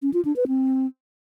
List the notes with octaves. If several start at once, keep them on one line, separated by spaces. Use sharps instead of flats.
C#4
F4
D4
B4
C4